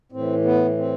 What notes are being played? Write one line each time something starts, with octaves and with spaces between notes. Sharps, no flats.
A2 E3 C4
B3
C4